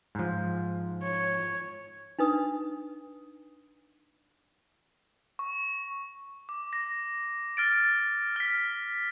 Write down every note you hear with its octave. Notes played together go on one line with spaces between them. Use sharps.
G#2 F3
C#5
D4 D#4 B4 D#6
C#6
D6
A#6
F6 A6 D7
F6 B6